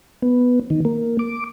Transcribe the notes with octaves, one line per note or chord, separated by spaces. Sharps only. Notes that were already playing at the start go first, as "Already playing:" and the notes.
B3
D#3
A#3
D6